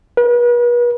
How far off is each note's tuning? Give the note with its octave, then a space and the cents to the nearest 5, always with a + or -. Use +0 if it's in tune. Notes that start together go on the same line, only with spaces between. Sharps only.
B4 -40